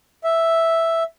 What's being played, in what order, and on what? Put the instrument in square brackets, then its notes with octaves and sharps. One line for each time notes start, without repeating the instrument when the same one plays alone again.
[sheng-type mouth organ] E5